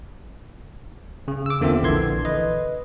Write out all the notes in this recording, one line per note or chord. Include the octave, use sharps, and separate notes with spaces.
C#3
D6 E6
E2 D3 A#3 C4 F4 E5
A#1 D3 E3 C6 G#6
B4 D#5